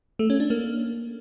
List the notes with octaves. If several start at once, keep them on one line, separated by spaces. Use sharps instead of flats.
A3
C#4
D4
A#3